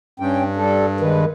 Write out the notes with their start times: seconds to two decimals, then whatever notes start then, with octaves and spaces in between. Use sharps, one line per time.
0.20 G2 C#4 G5
0.57 G3 A4
1.00 D#3 G#3 B4